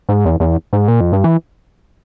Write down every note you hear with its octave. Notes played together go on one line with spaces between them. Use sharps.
G#2
E2
E2
G#2
A#2
F2
G2
E3